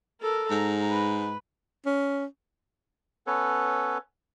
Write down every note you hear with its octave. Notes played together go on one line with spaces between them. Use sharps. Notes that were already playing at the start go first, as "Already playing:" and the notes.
A4 A#4
G#2 A#5
B4
C#4
B3 C#4 A4 B4 C#5